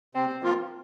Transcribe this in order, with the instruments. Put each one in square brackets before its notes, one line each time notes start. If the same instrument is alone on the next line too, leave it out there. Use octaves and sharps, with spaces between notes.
[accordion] C3 [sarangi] C4
[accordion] F3 A#3 F4